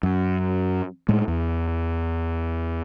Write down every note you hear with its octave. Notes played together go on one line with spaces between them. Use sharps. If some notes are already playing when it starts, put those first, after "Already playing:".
F#2
A2 G#3
E2